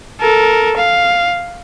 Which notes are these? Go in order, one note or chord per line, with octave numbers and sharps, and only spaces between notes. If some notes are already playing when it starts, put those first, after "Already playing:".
A4 A#4
F5